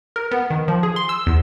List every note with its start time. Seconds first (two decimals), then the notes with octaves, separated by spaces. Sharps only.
0.16 A#4
0.31 B3
0.50 D#3
0.68 F3
0.83 G#4
0.96 C6
1.09 E6
1.26 E2